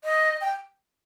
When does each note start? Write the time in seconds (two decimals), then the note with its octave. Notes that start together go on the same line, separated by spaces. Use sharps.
0.04 D#5
0.41 G5